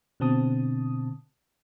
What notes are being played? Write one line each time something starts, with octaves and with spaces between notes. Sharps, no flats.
B2 D3 C4 A5 D#6